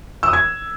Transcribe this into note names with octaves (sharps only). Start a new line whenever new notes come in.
E6
D#6
G#6